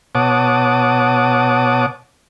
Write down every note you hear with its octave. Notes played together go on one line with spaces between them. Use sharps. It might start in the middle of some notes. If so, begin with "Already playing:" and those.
B2 C#5 F#5 A5 D6 D#6